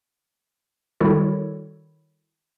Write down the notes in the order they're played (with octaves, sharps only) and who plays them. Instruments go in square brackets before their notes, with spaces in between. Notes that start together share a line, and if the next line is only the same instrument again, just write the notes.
[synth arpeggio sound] D#3 G3 E4 F#4 A4 C#5